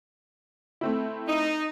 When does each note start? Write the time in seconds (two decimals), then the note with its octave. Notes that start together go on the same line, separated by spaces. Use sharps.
0.81 A3 C4 E4
1.28 D#4